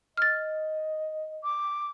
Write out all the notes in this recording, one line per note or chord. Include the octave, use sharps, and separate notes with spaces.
D#5 F6 A6
D6